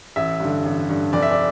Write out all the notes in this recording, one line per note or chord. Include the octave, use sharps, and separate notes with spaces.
A1 E5
G2 D3
A1
G2 D3
F1 D5
E5
D5